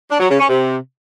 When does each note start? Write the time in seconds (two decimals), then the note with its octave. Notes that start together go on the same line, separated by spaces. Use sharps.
0.10 D4
0.20 F#3
0.29 C#3
0.39 C#4
0.49 C3